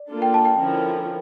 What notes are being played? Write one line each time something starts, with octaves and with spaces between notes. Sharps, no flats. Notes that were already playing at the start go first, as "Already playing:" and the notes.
Already playing: D5
A#3 D4 F4 A4
G5
A5
G5
D3 F3 C#4 E4 A#4